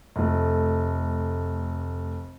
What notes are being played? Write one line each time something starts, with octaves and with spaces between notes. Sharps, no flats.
F1 A3